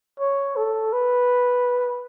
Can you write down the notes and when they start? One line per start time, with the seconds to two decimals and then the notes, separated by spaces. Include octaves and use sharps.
0.20 C#5
0.56 A4
0.93 B4